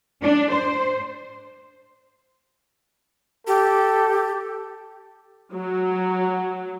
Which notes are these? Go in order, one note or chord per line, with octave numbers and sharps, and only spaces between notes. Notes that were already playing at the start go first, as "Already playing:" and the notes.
D4
C5
G4 A4
F#3